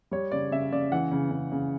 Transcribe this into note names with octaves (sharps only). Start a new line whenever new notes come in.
G3 C#5
C#3 D5
C#3 E5
C#3 D5
E3 F#5
C#3
C#3
C#3